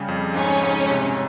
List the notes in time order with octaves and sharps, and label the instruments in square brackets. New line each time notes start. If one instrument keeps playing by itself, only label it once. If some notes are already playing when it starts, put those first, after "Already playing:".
Already playing: [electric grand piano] C#3 G3
F2
[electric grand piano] G#2 [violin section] C#4
[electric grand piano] G#2
C3